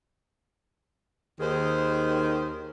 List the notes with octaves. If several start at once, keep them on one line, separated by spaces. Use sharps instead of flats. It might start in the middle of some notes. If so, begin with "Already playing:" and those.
D#2 D#3 G#4 C5